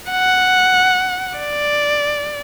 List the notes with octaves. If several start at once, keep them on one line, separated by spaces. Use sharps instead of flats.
F#5
D5